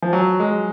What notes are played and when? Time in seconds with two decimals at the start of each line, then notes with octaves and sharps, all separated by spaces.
0.02 F3
0.13 F#3
0.40 G#3